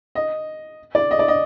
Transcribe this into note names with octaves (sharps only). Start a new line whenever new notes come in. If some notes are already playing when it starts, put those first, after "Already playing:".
D#5
D5
D#5
D5
D#5